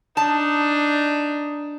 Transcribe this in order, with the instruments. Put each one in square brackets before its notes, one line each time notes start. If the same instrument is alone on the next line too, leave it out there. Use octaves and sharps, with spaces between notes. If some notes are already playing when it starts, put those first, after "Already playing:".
[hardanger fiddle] D4 [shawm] D#4 [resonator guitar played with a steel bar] A5